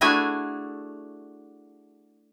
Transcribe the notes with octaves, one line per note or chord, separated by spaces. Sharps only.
A3 D4 E4 F#4 G#4 G#5